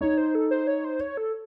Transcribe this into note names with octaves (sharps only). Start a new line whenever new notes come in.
D#4 C#5
C5
A4
C5
C#5
C5
C#5
A4